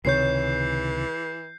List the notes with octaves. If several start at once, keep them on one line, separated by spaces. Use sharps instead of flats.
C#2 C3 D#3 E3 G#4 C#5 G6 C7